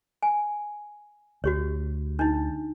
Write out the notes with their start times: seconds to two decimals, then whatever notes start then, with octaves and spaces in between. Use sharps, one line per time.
0.23 G#5
1.44 D2 F#4 G4 C#5
2.19 D4 D#4